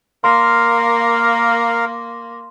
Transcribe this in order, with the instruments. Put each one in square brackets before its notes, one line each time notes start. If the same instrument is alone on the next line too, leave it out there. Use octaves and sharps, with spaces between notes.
[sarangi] A#3 [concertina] A#4 F5 [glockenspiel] C6